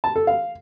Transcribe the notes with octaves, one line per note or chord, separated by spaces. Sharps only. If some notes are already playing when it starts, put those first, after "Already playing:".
A5
A4
F5